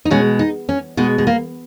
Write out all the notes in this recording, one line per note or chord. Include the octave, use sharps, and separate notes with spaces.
D#4
B2 G#3 C#4
D#4
C#4
B2 G#3 B3
G#3
A#3